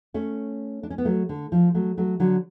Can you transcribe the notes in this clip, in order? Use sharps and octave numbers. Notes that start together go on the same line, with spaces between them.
A3 C#4
D4
C#4
B3
F#3 A3
D3
F3
F#3 A3
F#3 A3
D3 F#3